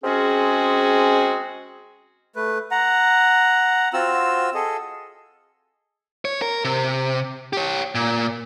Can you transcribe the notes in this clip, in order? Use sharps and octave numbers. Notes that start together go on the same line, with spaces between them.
G#3 C4 C#4 F#4 G#4
A3 B4
F#5 A#5
C4 F4 F#4 E6
G#4 A4 D#5
C#5
A#4
C3
G4 C#5
A#2